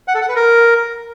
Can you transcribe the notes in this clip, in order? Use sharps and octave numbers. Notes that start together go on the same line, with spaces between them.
F#5
A4
F#5
B4
A#4